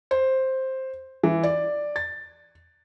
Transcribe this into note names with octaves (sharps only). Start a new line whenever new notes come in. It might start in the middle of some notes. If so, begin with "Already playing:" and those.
C5
E3
D5
A6